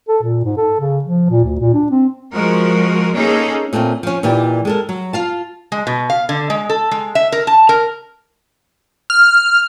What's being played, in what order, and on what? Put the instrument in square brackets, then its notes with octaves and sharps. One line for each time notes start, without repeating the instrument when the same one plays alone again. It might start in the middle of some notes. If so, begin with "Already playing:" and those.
[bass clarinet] A4
A#2
G#2
A4
C#3
F3
A#2
D2
A#2
D4
C4
[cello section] F3 G#3 F#4 A#4
A#3 C#4 D#4 G#4 A4
[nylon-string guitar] A#2 A3 A#3 C4 C#4
F3 C#4
A#2 E3 D#4 G4 D5
G#3 A4 A#4
F#3
F4 F5 A5
[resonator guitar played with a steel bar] G#3
B2
F5
D3
G#3
A4
G#3
E5
A#4
A5
A#4
[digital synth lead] F6